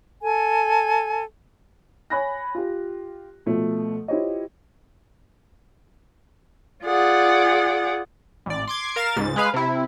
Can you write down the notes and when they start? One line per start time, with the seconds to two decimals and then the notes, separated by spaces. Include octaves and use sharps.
0.22 A4 G#5
2.10 C#5 G#5 B5 F#6 A#6
2.55 F4 G4
3.46 B2 F3 A3
4.08 E4 F4 G4 C5 C#5 D#5
6.85 F4 G#4 D5 F#5
8.46 A1 D5
8.67 C6 D6 G#6
8.96 A#4 F5 A6 E7
9.16 C#2 G#2 A6
9.36 G#3 G#4 B4 F5
9.54 C3 E4